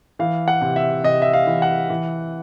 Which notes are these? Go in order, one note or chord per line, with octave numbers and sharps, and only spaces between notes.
E3 F5
F#5
C3
E5
C3 D#5
E5
F5
E3
F#5
E3